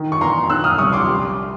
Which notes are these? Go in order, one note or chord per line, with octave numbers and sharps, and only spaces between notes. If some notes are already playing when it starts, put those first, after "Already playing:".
Already playing: D#3
C#6
E2 A#5 C6
D#3 E6 F#6
D#6 F6
C2 C#6 D#6
C6 D6
G3